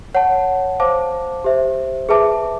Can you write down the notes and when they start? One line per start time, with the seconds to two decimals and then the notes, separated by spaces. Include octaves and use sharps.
0.15 C#5 F#5 A5
0.80 C5 F5 A5 D6
1.44 G4 C5 E5
2.09 G#4 B4 E5 A5 D6